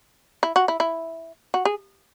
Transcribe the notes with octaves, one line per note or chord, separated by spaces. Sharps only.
E4
F#4
E4
E4
F#4
G#4